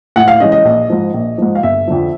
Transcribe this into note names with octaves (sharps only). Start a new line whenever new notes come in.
A2 F#5
F5
E3 G#3 C#4 D#5
D#5
A#1
G#2 F3
A#1
G#2 F3
F5
G1 E5
F2 D3 F3